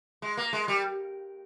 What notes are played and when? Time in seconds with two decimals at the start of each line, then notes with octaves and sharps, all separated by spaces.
0.22 G#3
0.37 A#3
0.53 G#3
0.68 G3